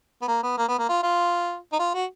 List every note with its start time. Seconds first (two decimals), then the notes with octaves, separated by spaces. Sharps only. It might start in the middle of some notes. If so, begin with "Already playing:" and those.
0.22 B3
0.28 A#3
0.43 B3
0.58 A#3
0.68 B3
0.79 A#3
0.89 F4
1.03 F4
1.72 D#4
1.79 F4
1.94 F#4